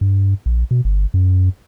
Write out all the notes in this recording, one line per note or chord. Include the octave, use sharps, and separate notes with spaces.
G2
A#1
B2
G1
F#2